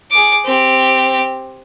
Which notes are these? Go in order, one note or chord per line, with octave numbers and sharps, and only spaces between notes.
G#4 D6
C4 G4